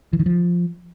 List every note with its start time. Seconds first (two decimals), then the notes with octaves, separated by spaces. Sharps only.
0.13 E3
0.20 D#3
0.26 F3